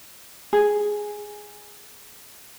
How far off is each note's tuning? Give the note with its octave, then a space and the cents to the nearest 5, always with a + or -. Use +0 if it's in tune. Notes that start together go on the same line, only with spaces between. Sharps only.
G#4 +0